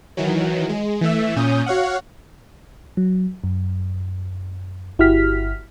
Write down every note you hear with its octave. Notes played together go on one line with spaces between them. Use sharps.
D#3 E3 F#3
G#3
E3 A3 E5
A#2 C#4 D#6 G6
F#4 C#5 F5 F#5
F#3
F#2
G1 E4 F#4 G4 F6 B6